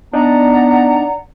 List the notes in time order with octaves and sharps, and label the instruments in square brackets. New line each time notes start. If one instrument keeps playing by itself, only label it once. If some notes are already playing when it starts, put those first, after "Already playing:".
[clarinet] B3 [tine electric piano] D4 D#4 [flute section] D5 F#5 A#5